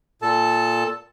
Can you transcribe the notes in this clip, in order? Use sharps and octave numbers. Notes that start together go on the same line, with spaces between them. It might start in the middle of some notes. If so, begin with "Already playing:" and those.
A#2 A4 A5